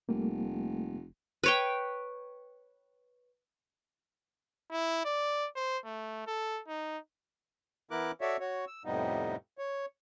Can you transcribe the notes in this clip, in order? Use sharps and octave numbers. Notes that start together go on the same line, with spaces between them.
F1 G3 A3 A#3
B4 C#5 G5
E4
D5
C5
A3
A4
D#4
E3 B3 E4 A#4 D6 F#6
F#4 A4 C#5 D5 E5
F#4 C#5
E6
F2 A2 C3 G3 B3 D#4
C#5